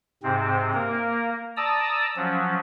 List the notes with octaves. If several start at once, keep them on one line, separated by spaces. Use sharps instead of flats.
G#2 C3 C4
A#3 A#4
D5 A5 A#5 D#6 E6
F3 F#3 C#4